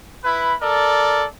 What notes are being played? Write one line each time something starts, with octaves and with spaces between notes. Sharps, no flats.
E4 B4 B5
A4 A#4 D5